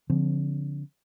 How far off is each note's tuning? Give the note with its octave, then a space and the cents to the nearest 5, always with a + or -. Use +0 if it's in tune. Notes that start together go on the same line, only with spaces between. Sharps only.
D3 -35 F3 +0 C4 -15